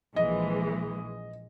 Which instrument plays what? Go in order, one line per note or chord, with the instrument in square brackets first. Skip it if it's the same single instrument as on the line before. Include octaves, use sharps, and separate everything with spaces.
[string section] A#1 E3 G#3 [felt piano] D#5